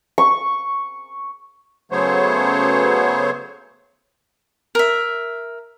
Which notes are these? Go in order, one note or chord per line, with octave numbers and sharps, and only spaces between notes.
C#6
C#3 F#3 A3 B3 C5 C#5
A#4 E5